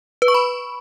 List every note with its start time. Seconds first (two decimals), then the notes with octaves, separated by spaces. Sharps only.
0.22 B4
0.28 C#6
0.34 B5